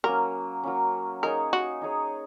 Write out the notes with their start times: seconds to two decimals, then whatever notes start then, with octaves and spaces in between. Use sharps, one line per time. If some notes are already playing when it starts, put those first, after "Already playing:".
0.04 F#3 A#3 C#4 A#4
0.64 F#3 A#3 C#4
1.23 D#4 G#4 A#4 C#5
1.53 F#4
1.82 D#4 G#4 C#5